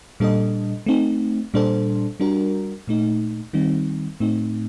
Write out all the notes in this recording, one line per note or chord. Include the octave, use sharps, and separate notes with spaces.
A#2 G3 D4 A4 D#5
A3 C4 D#4
A#2 G3 D4 A4 C5
G3 D4 F#4 A#4
A#2 A3 D#4
D#3 G3 C4 D#4
A2 A3 C4 D#4